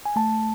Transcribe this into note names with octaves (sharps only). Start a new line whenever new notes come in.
G#5
A3 A5